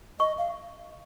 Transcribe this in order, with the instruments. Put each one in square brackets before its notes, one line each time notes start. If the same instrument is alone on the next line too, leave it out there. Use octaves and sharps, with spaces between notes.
[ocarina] D#5 [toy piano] C#6
[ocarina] F5